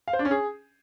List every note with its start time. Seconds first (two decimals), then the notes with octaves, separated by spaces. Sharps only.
0.08 F5
0.13 C5
0.19 D4
0.25 C#4
0.31 G#4